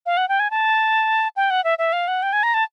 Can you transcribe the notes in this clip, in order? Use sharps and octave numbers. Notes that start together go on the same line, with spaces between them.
F5
F#5
G5
G#5
A5
G5
F#5
E5
E5
F5
F#5
G5
G#5
A#5
A5